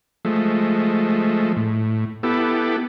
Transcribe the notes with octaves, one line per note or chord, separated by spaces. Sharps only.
F3 G#3 A3
A2
B3 E4 G4 A4